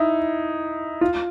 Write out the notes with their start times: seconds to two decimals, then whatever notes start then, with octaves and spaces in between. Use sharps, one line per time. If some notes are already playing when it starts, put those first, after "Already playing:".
Already playing: D#4 E4
1.01 F4